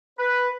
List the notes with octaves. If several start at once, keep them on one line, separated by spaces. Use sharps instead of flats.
B4